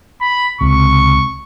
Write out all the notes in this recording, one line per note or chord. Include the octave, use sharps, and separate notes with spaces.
B5
C#2 C3 C#6